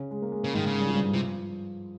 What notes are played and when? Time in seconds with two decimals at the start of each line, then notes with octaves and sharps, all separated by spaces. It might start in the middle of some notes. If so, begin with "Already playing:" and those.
Already playing: C#3 C#4
0.11 G#3
0.22 A#3
0.32 G#3
0.43 C#3 A#3
0.54 G#2 D#3 G#3
0.66 C#3
0.80 G3
0.87 F3
0.94 G2 G3
1.13 C3 F3